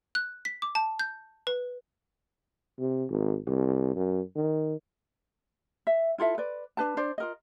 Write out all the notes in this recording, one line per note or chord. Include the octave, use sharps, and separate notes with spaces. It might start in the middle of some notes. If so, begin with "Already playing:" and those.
F#6
B6
D6
A5
G6
B4
C3
G#1
C2
F#2
D#3
E5
E4 F4 A4 E5
B4 D5
D4 B4 A5
D4 C5 D5
F4 A#4 D#5